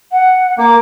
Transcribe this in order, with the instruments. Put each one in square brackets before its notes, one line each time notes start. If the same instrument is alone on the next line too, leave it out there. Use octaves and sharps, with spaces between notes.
[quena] F#5
[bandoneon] A#3 [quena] D6